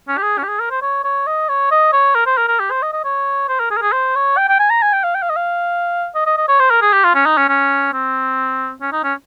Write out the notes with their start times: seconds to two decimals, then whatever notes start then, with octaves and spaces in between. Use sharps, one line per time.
0.08 C#4
0.18 G4
0.23 G#4
0.38 C#4
0.43 G4
0.49 G#4
0.60 A#4
0.71 C5
0.82 C#5
1.04 C#5
1.27 D#5
1.49 C#5
1.71 D#5
1.93 C#5
2.15 A#4
2.26 C5
2.38 A#4
2.48 A#4
2.60 G4
2.71 C5
2.82 D#5
2.93 D#5
3.04 C#5
3.48 C5
3.60 A#4
3.71 G#4
3.77 A#4
3.82 G#4
3.92 C5
4.15 C#5
4.37 G5
4.49 G5
4.59 G#5
4.70 A#5
4.82 G#5
4.93 G5
5.04 F5
5.15 G5
5.22 F5
5.30 D#5
5.36 F5
6.15 D#5
6.26 D#5
6.37 D#5
6.48 C#5
6.59 C5
6.70 A#4
6.82 G#4
6.93 G4
7.04 F4
7.15 C#4
7.26 D#4
7.37 C#4
7.48 C#4
7.93 C4
8.81 C#4
8.92 D#4
9.04 C#4